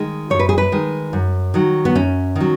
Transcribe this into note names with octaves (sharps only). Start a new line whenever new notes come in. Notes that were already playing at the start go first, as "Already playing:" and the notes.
Already playing: D#3 G#3
F#2 C#5
B4
G#4
B4
D#3 G#3
F#2
D#3 F#3
B3
F#2 C#4
D#3 F#3